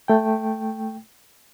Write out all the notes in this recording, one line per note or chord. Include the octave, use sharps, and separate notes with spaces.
A3 G5